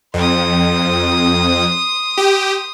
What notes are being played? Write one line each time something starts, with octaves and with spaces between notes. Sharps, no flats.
F2 C6 D#6
G4